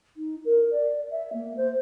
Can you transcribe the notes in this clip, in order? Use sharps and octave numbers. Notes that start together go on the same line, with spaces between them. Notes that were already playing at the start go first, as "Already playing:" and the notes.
D#4
A#4
D5
E5
A#3
C5